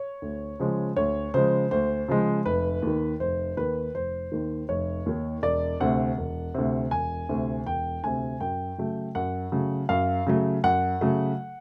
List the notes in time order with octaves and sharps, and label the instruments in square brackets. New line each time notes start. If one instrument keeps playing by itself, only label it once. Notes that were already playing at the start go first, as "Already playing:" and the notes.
Already playing: [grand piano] C#5
D2
C#3 F3 G#3
D2 C#5
C#3 F3 G#3 C5
D2 C5
C#3 F3 G#3
F1 B4
D#2 D#3
F1 C5
D#2 D#3 B4
F1 C5
D#2 D#3
F1 C#5
D#2 D#3
E1 D5
D2 C3 F#5
E1
D2 C3
E1 G#5
D2 C3
E1 G5
D2 C3 G#5
F#2 G5
C#3 F#3 A3
F#2 F#5
C#3 F#3 A3
F#2 F5
C#3 F#3 A3
F#2 F#5
C#3 F#3 A3